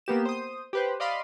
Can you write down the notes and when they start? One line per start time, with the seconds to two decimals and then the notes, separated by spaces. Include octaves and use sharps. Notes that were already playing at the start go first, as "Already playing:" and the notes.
0.06 A#3 B3 G4 E7
0.25 C5 D#6
0.73 G4 B4 C5
1.00 D5 D#5 F5 B5 C6 D6